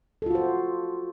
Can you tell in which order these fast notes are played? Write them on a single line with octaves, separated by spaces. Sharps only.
A4 F4 F#4 C5